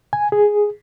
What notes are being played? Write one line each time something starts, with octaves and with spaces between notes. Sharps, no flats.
G#5
G#4